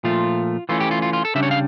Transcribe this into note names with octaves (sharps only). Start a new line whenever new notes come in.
A#2 F3 A3 F4
E3 A3 C#4 F4
G4
F4
F4
F4
A4
C#3 G3 D4 E5
C#5
F5